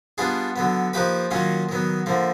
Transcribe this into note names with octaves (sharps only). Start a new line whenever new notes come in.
G3 B3 D4 F4 G#4
D3 F#3 B3
F3 A#3 D#4 G4 B4
D#3 F#3 A#3 C#4 F4
D#3 F#3 B3
D3 F3 A#3